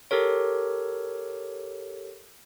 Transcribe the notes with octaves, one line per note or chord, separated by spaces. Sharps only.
G4 A4 A#4 C#5